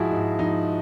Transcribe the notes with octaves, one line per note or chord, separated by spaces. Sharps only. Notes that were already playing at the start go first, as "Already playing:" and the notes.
Already playing: G#2 F3 E4 F#4 G#4
G#2
F3 D#4